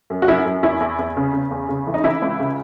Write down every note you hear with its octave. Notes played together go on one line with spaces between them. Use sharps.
F#2
F#4
F#2 E4
F#2
E2 E4
E2
E2
C#3
C#3
E2
C#3
E3
D#4
E3 E4
C#2
C#3